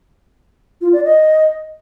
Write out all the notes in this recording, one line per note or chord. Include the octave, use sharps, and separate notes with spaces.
F4
D5
D#5